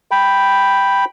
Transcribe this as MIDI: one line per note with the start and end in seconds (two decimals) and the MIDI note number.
0.11 1.05 79
0.11 1.05 83